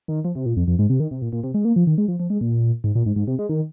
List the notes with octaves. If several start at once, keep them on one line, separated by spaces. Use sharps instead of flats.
D#3
F3
C3
A#2
F2
F2
G#2
C3
D#3
C3
A#2
A#2
C3
G#3
A#3
F3
D#3
G#3
F3
F3
G#3
A#2
G#2
A#2
G#2
G#2
C3
G#3
D#3